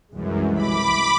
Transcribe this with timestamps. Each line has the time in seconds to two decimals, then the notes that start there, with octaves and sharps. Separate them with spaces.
0.15 C2 F#2 E3 G#3
0.55 B5 D6